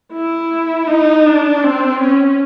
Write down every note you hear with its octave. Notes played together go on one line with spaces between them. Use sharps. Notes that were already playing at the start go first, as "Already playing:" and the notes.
E4
D#4
D4
C4
C#4